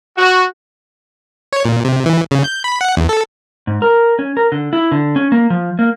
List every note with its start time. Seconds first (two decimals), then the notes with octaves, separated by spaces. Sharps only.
0.17 F#4
1.53 C#5
1.65 A#2
1.85 C3
2.06 E3
2.31 C#3
2.44 G6
2.64 B5
2.81 F#5
2.97 E2
3.09 A4
3.67 G#2
3.82 A#4
4.19 C#4
4.37 A#4
4.52 D3
4.73 E4
4.92 D3
5.16 C#4
5.32 A#3
5.50 F3
5.79 A#3